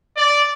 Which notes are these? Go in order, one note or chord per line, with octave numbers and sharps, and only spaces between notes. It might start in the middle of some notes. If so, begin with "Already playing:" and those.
D5